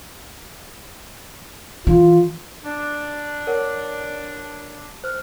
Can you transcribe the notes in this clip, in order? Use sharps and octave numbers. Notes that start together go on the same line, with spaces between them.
E3 F4
D4
A#4 C#5 F#5
C5 F6